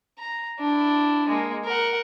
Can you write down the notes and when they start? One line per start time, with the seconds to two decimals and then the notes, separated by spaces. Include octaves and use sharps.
0.18 A#5
0.59 D4 E4
1.28 G#3 A#3
1.65 A#4 F#5